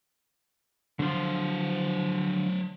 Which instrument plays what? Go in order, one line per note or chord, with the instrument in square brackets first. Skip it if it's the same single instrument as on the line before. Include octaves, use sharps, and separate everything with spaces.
[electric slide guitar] D3 F3 [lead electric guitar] F#3 C5